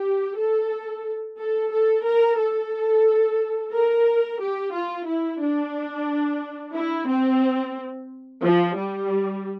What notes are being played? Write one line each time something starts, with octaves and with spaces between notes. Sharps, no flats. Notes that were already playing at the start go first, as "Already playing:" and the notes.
Already playing: G4
A4
A4
A4
A#4
A4
A#4
G4
F4
E4
D4
E4
C4
F3
G3